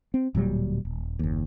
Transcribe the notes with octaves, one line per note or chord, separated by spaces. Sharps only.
C4
D1 A#2 F#3 G3
D#1
F#1 D#2